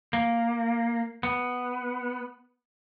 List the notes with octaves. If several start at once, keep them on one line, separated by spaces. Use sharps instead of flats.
A#3
B3